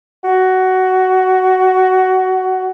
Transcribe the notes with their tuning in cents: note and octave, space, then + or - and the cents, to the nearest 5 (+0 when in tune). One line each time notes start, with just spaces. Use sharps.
F#4 +15